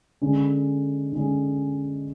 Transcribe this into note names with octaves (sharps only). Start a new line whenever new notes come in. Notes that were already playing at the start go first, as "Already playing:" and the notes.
D3 G#3 C#4
D3 G#3 C#4